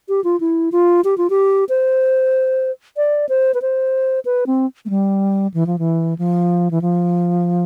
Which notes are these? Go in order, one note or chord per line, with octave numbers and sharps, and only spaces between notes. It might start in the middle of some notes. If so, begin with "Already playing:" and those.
G4
F4
E4
F4
G4
F4
G4
C5
D5
C5
B4
C5
B4
C4
A3
G3
E3
F3
E3
F3
E3
F3